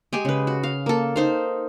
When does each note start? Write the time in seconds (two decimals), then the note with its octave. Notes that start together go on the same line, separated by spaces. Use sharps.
0.13 G#3 G4 G#4 G#5
0.25 C#3 B4
0.47 F#4
0.63 F5
0.86 A#3 A4
1.16 D#4 C5 F5